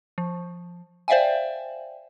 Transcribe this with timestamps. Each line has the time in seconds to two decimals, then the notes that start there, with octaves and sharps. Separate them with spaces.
0.18 F3
1.08 C5 D5 E5 F5 G5 G#5